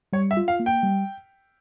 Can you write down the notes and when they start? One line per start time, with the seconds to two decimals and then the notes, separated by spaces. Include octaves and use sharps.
0.13 G3 C#5
0.31 E5
0.37 F4
0.48 F5
0.60 A#3
0.66 G5
0.83 G3